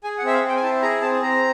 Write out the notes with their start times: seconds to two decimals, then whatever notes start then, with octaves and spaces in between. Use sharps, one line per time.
0.04 G#4 G#5
0.18 F#5
0.23 C4 E5
0.34 F5
0.43 C4
0.49 G5
0.56 G#5
0.63 E4 A5
0.82 G#4 A#5
1.02 C4 A5
1.22 C4 A#5